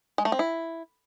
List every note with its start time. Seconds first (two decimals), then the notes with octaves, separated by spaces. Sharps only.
0.18 G#3
0.25 A3
0.32 C4
0.39 E4